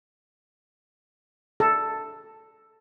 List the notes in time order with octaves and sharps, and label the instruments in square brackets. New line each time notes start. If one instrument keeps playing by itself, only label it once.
[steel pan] A4